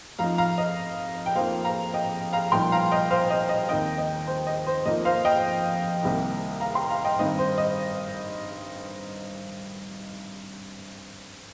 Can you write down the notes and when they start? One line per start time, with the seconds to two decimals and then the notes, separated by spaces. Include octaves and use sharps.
0.19 F2 F3 D#4 F5 A#5
0.38 F5 A#5
0.58 D#5
1.26 G5
1.35 F2 F3 A#3 D#4 C5 F5
1.65 F5 A#5
1.94 D#5 G5
2.33 F5 A#5
2.52 C2 A#2 F3 D#4 G5 C6
2.72 F5 A#5
2.91 D#5 G5
3.10 C5 F5
3.30 D#5
3.49 D#5
3.69 D#2 D#3 C4 D#5 G5
3.98 D#5
4.27 C5
4.47 D#5
4.67 C5
4.86 F2 F3 A#3 D#4 D#5
5.05 C5 F5
5.25 D#5 G5
6.02 C2 C3 D#3 A#3
6.60 F5 A#5
6.75 G5 C6
6.90 F5 A#5
7.04 D#5 G5
7.19 G2 D#3 C4 D#4 D#5
7.39 C5
7.58 D#5